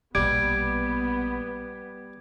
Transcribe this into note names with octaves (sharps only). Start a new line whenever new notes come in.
A#1 B2 G3 B3 G#6 D7